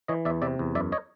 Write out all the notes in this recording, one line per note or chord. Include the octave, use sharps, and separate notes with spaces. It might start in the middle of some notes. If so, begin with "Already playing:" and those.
E3 C#5 D#5
E2 D5 E5
C3 D5 E5
E2
F#2 D5 E5
C#5 D#5